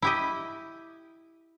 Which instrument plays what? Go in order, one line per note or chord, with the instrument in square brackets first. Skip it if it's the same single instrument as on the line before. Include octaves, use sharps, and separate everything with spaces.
[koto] E4 G4 D#5